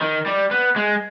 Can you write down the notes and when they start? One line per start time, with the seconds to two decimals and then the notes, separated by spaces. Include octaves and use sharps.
0.01 D#3
0.26 G3
0.51 B3
0.76 G#3